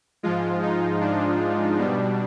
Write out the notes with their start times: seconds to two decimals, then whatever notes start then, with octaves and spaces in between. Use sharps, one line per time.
0.23 G#2 F3 G#3 F4
0.62 D#4
1.01 D4
1.78 B2 G3